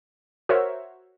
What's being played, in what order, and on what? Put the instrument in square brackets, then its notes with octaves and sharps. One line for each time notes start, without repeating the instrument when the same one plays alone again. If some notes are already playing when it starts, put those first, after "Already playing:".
[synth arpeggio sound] F#4 A#4 C5 C#5 E5